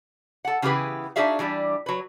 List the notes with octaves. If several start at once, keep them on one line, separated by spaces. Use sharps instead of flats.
A4 F#5
C#3 E3 B3 G4 G#4 B4
D4 D#4 F#4 G#4 E5 F5
E3 G3 D4 G4
F#3 B4